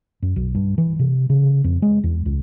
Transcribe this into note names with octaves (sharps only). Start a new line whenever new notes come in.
F#2
B1
G2
E3
C3
C#3
F2
G#3
E2
C#2